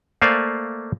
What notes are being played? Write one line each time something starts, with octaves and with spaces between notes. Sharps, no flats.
A3 A#3 C5 D5 F5 G#5